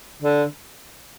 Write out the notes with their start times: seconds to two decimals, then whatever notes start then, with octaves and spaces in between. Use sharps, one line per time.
0.22 D3